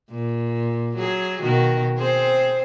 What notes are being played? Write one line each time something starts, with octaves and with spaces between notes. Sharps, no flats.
A#2
F#3 G#4
B2 D#3 F#4
C4 G#4 C5